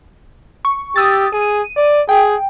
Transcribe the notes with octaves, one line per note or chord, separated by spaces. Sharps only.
C#6
G4 D#6 E6 A6
G#4 D#7
D5
G#4 G5